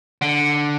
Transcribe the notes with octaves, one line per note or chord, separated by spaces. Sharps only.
D3